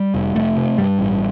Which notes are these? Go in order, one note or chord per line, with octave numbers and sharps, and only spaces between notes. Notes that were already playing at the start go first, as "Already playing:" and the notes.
Already playing: G3
F1
F1 A3
C3
G2 G3
A1